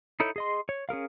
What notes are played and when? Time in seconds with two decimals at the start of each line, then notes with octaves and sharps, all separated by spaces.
0.20 D#4 E4 A4 C#5 G6
0.36 G#4 D#5 C6
0.69 C#5
0.89 C#4 G#4 A#4 F5